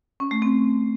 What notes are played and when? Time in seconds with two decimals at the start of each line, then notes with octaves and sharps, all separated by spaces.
0.20 C#4
0.31 A3
0.42 C4